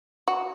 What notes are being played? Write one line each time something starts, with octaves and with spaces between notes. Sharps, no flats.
F#4